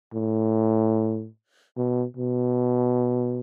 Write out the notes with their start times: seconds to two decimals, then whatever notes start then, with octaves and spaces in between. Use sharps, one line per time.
0.14 A2
1.77 B2
2.17 B2